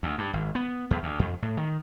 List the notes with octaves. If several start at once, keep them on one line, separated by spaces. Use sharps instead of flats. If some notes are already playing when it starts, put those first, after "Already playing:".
D2
G2
G#1
B3
E2
D2
F2
A2
D#3